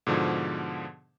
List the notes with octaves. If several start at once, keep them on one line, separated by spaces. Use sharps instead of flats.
G#2 B2 D3 F3